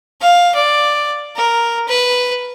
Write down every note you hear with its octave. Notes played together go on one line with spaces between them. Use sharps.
F5
D5
A#4
B4